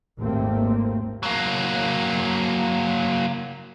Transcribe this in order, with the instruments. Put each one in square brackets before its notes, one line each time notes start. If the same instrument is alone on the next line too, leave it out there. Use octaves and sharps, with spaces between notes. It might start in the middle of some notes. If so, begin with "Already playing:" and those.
[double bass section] G#1 D#2 A3 A#3 C4
[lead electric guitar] F#3 A#3